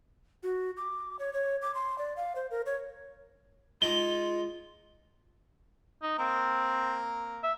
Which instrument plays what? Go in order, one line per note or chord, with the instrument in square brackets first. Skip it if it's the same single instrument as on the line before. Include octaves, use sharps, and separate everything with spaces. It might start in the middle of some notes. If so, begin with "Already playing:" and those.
[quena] F#4
D6
C#5
C#5
D6
C6
D5
F5
C5
A#4
C#5
[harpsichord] G#3 D#4 [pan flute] F4 [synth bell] G7
[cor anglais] D#4
[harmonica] A#3 A#4 [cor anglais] C4
[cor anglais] E5